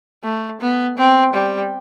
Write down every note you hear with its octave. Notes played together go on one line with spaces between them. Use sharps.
A3
B3
C4
G3